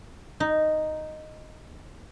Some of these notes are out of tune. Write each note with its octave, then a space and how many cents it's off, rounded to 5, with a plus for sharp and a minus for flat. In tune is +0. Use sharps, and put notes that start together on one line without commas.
D#4 -5